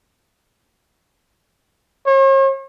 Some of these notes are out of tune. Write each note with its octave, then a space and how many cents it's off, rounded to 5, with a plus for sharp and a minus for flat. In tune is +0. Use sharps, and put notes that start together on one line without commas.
C#5 -45